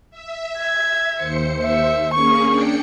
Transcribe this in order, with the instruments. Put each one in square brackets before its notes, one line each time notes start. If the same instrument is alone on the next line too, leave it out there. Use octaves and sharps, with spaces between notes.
[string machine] E5
[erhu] G#6
[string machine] D#2 C5 C#7
[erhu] E5
[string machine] A#3 C#4 G#4 [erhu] C#6
[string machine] D4 G5 C#7